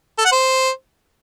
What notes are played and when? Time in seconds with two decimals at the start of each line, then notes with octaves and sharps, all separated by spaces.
0.18 A4
0.25 F#5
0.32 C5